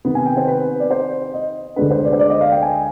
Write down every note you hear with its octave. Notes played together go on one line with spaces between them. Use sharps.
C3 D#3 B3
G#5
G5
C5
B4
D5
C5
D#5
D2 D3 G#3 D4 B4
C5
D5
C5
D5
D#5
F5
G5
G#5